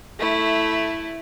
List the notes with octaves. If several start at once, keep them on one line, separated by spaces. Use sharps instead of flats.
A3 E4